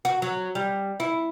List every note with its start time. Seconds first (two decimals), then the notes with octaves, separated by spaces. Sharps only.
0.05 F#4
0.22 F#3
0.55 G3
1.00 E4